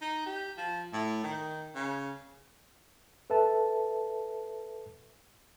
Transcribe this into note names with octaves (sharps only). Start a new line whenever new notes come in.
D#4
G4
F3
A2
D#3
C#3
A4 B4 E5 A5